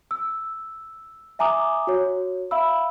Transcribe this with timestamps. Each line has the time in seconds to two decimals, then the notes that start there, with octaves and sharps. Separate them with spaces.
0.11 E6
1.39 E5 G#5 A#5 D6 D#6
1.87 F#4 C#5
2.51 E5 F5 B5 E6